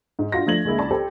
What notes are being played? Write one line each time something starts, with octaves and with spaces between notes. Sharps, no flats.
G#2
G2 F4 F#4 A#6
F3 A3 D4 G#6 F#7
D2 G#3 A#3 E4
C#2 D5 A5 B5
G4 A4 C5 G5